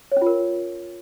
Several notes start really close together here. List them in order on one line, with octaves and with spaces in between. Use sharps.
C#5 C#4 F4 A#4